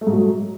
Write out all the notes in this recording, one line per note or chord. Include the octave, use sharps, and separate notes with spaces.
A3
G#2
F#3